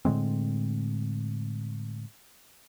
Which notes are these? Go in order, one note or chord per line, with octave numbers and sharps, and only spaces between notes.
A2 D3 G#3 C4